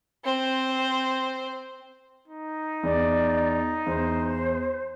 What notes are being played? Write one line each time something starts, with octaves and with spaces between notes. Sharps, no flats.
C4 C5
D#4
E2 D5
E2 C5